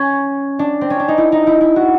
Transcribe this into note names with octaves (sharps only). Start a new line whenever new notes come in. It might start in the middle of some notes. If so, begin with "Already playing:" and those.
Already playing: C#4
D4
C4
C#4
D4
D#4
E4
D#4
E4
E4
F#4